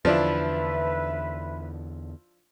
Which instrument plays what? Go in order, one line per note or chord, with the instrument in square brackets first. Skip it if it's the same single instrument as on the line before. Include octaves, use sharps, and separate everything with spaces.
[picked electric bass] E2 D3 [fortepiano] F3 D4 E4 [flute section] B4 E5